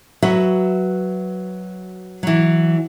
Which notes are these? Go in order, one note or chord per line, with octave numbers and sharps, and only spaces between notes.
F#3 F#4 B4 E5
E3 F#3